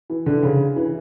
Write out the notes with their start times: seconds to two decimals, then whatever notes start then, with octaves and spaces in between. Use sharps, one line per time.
0.10 E3
0.26 D3
0.43 C#3
0.76 E3